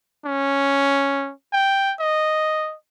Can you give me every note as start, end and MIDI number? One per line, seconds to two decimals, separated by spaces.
0.25 1.32 61
1.53 1.94 79
2.00 2.75 75